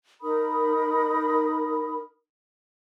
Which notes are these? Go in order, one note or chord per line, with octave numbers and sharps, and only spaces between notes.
D#4 A#4 B5 D#6